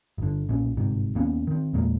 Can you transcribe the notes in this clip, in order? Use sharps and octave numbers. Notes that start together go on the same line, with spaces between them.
G1 D3
B1 A#2 C#4
G1 G#2 C3
D#2 A#3 B3 C#4
D#3 C4
E2 A#2 G#3 A#3